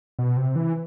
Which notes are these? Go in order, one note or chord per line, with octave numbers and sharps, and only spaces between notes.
B2
C3
E3